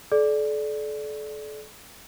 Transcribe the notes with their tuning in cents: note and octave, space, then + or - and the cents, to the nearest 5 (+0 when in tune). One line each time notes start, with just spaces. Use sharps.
A4 -40 D5 +0